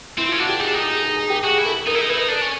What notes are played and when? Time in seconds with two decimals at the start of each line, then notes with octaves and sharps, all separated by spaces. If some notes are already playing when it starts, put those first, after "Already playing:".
0.18 C4 E4
0.29 C#4 F4
0.39 D4 F#4
0.49 G4
0.59 D#4 G#4
0.67 D4
0.73 D#4 G4
0.88 G#4
1.03 G#4
1.16 G#4
1.30 G4
1.44 F#4 G#4
1.58 E4
1.65 A4
1.86 D#4 A#4
1.94 E4
2.01 D#4
2.08 E4 B4
2.18 D#4
2.28 D4 A4
2.41 C#4